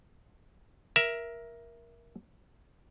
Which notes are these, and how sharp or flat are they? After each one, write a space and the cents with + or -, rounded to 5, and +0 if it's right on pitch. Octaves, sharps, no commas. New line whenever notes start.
A#4 +15 E5 +10